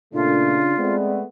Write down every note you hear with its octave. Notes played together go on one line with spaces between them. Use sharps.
A#2 C#3 A3 D4 F4
G#3 A3 B3 C4 D5